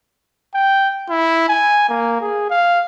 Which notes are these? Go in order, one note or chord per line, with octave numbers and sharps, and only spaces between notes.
G5
E4
G#5
A#3
G#4
F5